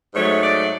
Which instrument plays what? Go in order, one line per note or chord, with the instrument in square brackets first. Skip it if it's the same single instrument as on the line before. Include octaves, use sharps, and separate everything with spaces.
[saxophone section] G#2 F#3 A3 C#5
D5